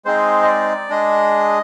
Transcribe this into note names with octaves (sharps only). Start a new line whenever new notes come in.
G#3 C4 D#4 G#4 C5
D#5
D5
G#3 D4 G#4 D#5